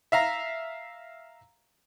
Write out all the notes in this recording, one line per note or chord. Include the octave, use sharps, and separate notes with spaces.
E5 F5 A#5